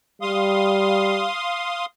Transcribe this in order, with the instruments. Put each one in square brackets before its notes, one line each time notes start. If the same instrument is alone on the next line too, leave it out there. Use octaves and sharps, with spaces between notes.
[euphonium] G3 [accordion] F5 C6 D#6